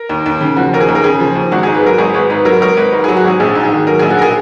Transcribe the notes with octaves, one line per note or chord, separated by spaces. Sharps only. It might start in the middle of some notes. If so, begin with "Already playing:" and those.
Already playing: A#4
D#2
D#2
C#3
F3 F#4
D#2 A#4
G#4
D#2
A#4
C#3 G#4
F3
D#2
G#1 F#4
G#2 G#4
B4
F#3 A#4
G#1 G#4
G#1 B4
G#2 B4
F#3 A#4
G#1 A#4
G#1 B4
G#2 A#4
F#3 G#4
F#4
G#1 G#4
A#1 G#4
G#2
G#4
D#3
F#3 A#4
A#1 G#4
F#4
A#4
G#4